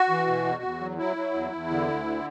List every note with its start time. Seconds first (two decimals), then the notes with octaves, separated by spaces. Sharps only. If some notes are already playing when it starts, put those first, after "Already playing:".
Already playing: F#4
0.09 E3
0.27 B2
0.45 E2
0.63 E2
0.80 F#3
0.98 F#3 E4
1.16 F#3
1.33 E2
1.52 E2
1.70 D3
1.88 D2
2.05 D3